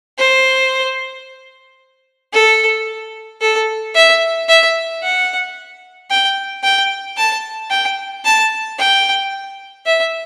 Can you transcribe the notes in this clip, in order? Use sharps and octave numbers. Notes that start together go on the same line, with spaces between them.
C5
A4
A4
E5
E5
F#5
G5
G5
A5
G5
A5
G5
E5